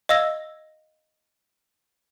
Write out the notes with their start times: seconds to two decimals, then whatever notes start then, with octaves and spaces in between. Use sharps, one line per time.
0.09 D#5 F5 E6 A#6